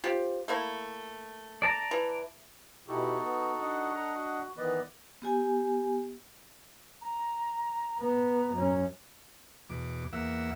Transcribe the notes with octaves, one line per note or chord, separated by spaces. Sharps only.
C4 F4 G4
A3 A#3 E4
D5 A5 A#5
E3
B2 D#4 E4 F#4 G4 A4
B3
D4 D#5 F#5
A4 A#5
F#4
D#3 E3 B3 B4 D5 D#5
B3 G4 G#5
A#5
B3 A#5
F#2 C#4
E2 B2 D6
E2 A#3 E5 F#5 E6